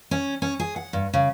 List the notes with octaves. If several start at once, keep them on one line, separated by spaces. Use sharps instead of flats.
C#4
C#4
G#4
F#5
G2
C#3